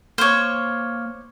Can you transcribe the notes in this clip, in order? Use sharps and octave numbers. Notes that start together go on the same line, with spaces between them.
A#3 C5 C#5 D6 F6